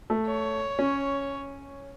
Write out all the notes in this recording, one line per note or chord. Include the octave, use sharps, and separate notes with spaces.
A3
C#5
C#4